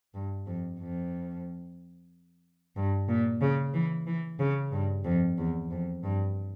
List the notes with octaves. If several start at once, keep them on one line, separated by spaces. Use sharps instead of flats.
G2
F2
F2
G2
A#2
C#3
E3
E3
C#3
G2
F2
E2
F2
G2